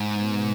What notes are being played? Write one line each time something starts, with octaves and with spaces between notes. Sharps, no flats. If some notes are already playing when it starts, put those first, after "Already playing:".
Already playing: G#2
B2 G#3 B3